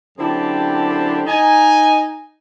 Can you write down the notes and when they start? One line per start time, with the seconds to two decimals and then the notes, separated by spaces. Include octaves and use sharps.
0.19 F#2 D3 C4 E4 G4 A5
1.27 D#4 G#5